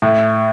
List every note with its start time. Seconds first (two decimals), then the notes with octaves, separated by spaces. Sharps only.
0.02 A2